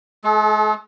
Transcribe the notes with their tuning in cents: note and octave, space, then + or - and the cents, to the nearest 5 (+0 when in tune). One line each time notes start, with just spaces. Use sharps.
G#3 +45 A4 -30